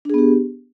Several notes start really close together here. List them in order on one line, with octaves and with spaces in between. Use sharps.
D4 G#4 B3 G4